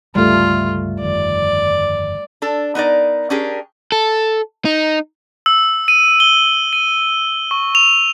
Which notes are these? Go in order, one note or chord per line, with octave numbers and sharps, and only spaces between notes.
G1 C#2 G2 G3 A3 F4
G1 F2 D#3 D5
D4 A4
B3 D#4 A#4 D5
C#4 D4 G4 G#4 A#4
A4
D#4
E6
D#7
G7
D#7
C#6
F7